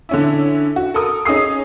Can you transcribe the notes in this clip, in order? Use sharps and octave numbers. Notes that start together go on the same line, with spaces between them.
D3 C#4 E4
F#4
A4 A#4 D#6
C#4 D#4 G#4 D#6 C7